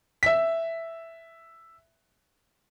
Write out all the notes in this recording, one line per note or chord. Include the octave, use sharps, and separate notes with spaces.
E5 B6